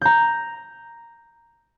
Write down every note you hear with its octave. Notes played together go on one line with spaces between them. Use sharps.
A#5 G6